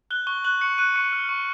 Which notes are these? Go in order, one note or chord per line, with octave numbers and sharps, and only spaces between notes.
F#6 G7
C#6 G7
F#6 F#7
C#6 C#7
F#6 D#7
C#6 C#7
F6
C#6